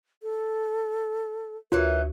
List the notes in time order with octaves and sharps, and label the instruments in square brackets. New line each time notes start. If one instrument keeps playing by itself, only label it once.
[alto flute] A4
[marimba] D2 F#4 [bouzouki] E3 F#3 D#4 [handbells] F4 [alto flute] A#4